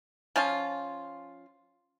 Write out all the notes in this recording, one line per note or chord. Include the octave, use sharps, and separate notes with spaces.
F3 C#4 F4